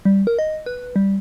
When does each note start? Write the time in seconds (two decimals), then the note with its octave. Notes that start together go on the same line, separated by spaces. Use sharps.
0.05 G3
0.27 A#4
0.39 D#5
0.66 B4
0.96 G3